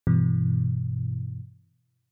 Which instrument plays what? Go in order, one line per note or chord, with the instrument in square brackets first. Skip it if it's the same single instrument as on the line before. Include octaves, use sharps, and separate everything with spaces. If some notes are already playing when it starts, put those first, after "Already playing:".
[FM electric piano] G2 B2 E3